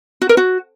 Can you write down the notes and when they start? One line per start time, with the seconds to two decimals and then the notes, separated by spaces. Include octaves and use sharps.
0.22 F#4
0.29 A#4
0.37 F#4